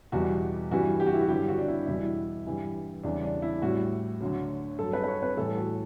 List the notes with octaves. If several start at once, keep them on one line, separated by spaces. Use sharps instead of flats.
E2 B2 G3 F#4
G2 E3 G3 F#4
G4
F#4
E4
F#4
G2 D3 F#3 G4
F#4
D4
E4
E2 B2 G3 E4
G2 E3 G3
E2 C#3 G3 D4
D4
E4
A2 G3 F#4
D2 D3 F#3
G2 F#3 A4
B4
B4
C#5
B4
A2 E3 G3 A4
F#4